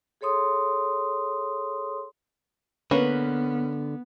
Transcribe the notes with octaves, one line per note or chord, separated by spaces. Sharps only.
G#4 A4 C#5 C6 D#6
D3 A#3 B3 C#4 B4